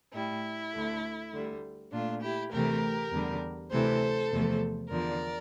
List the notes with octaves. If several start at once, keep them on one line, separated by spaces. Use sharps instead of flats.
A2 G3 E4
D2 D3 A3
D2 D3 G3
A#2 A3 D4 F4
E4 G4
D2 C3 E3 A3 G4 A#4
E2 D3 G3
D2 C3 E3 A4 C5
E2 C3 F3 A3
E2 D3 F3 A#4 D5